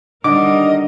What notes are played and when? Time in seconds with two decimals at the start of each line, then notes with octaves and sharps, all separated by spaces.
0.24 D3 D#3 G3 A#4 D#5 D6